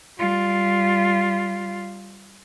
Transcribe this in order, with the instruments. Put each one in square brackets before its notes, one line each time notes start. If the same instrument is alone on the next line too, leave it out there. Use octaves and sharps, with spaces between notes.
[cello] G3 F4